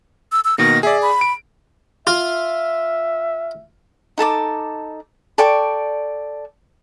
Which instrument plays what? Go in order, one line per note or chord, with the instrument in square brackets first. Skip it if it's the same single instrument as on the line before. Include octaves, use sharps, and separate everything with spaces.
[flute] E6
E6
[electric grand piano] B2 D#3 A#3 [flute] A#6
[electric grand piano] G#4 D5 [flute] E5
[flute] B5
[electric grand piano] D7
[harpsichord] F4 [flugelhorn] E5
[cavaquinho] D#4 A4 A5 D6
A4 D5 G5 C#6